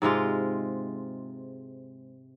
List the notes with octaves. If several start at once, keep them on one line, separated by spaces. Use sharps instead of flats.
G#2 C3 G#3 F4